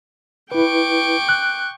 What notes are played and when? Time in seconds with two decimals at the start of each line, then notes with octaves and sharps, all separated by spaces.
0.52 E4 B4 G5 C#6 D6
1.29 F#6